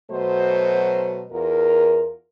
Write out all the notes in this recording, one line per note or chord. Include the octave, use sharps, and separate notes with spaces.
B2 F#3 A3 C5
E2 F4 A#4